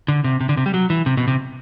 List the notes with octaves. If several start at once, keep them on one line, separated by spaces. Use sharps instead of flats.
D3
C3
C3
D3
C3
G3
F#3
E3
C3
B2
C3